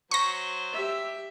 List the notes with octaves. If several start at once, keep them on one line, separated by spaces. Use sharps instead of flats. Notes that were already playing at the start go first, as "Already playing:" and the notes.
F#3 C5 C#6 A#6
G4 E5